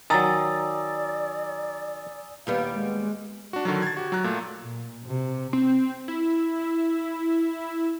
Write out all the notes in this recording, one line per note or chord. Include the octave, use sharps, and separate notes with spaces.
D#3 F#3 D5 G#5 A#5 D#6 E6 A6
D#2 G3 B3 F5
G#3
D4 F#4
D3 D#3 F#3
G#6 A6
F#4 G4
F#3 A#5 F#6
A#2 A3
A#2
C3
C4
E4